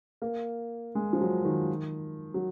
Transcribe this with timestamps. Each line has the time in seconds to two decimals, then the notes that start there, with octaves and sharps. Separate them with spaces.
0.22 A#3
0.95 G#3
1.13 F3
1.21 F#3
1.45 D#3
2.34 F#3